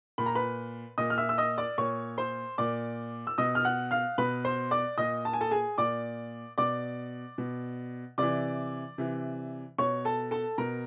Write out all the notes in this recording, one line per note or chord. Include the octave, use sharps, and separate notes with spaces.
A#2 B5
A#5
B4 B5
A#2 D#5 D#6
F6
E5 E6
E6
D#5 D#6
D5 D6
A#2 C#5 C#6
C5 C6
A#2 D5 D6
E6
B2 D#5 D#6
F6
F#5 F#6
F5 F6
B2 B4 B5
C5 C6
D5 D6
A#2 D#5 D#6
A5
G#5
A4 A5
G#4 G#5
A#2 D5 D6
B2 D5 D6
B2
C3 E3 D5 D6
C3 E3
B2 C#5 C#6
A4 A5
A4 A5
B2 A#4 A#5